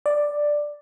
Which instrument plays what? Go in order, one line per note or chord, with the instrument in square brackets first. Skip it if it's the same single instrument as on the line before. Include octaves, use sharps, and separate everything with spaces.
[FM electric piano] D5